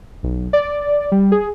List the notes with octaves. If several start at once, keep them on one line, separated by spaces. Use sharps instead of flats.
B1
D5
G3
G#4